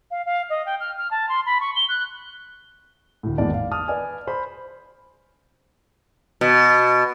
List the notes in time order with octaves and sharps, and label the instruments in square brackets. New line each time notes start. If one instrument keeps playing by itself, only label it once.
[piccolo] F5
F5
D#5
G5
F6
F6
A5
C6
B5
C#6
G7
F#6
[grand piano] D2 A2
G#1 E2 D5 A5
F5
A5 D#6 F6
B4 D5 G#5
C5 B5
[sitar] B2